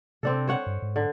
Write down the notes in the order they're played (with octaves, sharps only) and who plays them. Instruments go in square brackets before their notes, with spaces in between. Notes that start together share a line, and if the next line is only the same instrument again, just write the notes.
[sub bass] C3 [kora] C4 D4 A4
[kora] C5 C#5 F#5
[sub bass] G2
G#2
[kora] D3